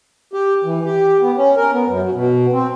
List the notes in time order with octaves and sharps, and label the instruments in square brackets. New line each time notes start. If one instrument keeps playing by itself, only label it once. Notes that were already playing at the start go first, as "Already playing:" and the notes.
[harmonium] G4
E3
G4
B3
C#4
A#4
B3
F#2
F#3
B2
C4